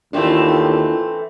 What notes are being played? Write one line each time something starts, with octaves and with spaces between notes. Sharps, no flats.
D#2 E3 A3 C4 D4 E4 F4